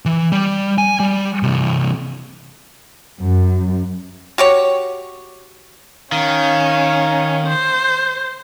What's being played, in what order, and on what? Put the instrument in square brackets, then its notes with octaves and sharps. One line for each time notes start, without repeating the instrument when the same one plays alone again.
[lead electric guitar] E3
G3
G#5
G3
C3 E3
[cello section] F#2
[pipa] F#4 G4 C#5
[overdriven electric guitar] D#3 [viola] C#4 [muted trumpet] F5
[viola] C5